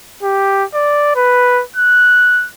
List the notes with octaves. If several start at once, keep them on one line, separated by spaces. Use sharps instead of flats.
G4
D5
B4
F#6